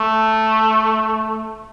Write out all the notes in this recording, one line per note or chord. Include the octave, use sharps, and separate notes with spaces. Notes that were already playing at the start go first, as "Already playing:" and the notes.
Already playing: A3